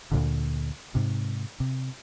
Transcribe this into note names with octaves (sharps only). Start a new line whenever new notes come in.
D2 A#2 D3
G#2 C3
C3